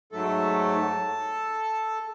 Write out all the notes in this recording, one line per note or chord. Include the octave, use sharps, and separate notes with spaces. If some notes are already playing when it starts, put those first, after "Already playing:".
G#2 F#3 A3 A4